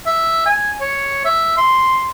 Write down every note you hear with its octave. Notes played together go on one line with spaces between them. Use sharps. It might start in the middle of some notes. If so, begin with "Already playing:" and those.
E5
G#5
C#5
E5
C6